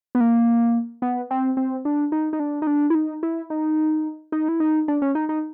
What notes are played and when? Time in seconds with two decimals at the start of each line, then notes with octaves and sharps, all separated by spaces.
0.15 B3
0.21 A#3
1.02 B3
1.31 C4
1.57 C4
1.85 D4
2.12 D#4
2.33 D#4
2.40 D4
2.62 D#4
2.67 D4
2.90 E4
2.95 D#4
3.23 E4
3.50 D#4
4.32 D#4
4.48 E4
4.60 D#4
4.88 D4
5.02 C#4
5.15 D#4
5.29 D#4